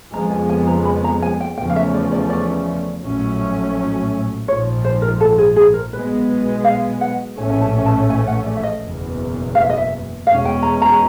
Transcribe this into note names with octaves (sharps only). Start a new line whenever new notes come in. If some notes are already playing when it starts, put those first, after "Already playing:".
F2 C#3 F3 G#3 B3 A#5
G#5
G#5
A#5
B5
A#5
G#5
G5
E2 C#3 F3 A3 C#4 G5
F5
E5
D5
D5
D5
A#1 A2 F#3 A3 C#4
A#1 G#2 F3 C#5
C5
A#4
A4
G#4
G#4
A#4
B1 B2 G#3 B3 B4
F5
F#5
A#1 A2 E3 A3 C#4 G#5
G#5
A5
G#5
A5
G#5
F#5
D5
E5
D#5
F#1 E2 B2
F5
E5
D#5
E5
E2 B2 G#3 C#4 F5
G5
A#5
A#5